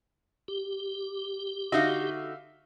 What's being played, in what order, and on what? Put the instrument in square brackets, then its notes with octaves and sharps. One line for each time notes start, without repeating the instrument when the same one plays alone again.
[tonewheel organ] G4
[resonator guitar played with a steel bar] D3 D#4 F#4 [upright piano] E5 F5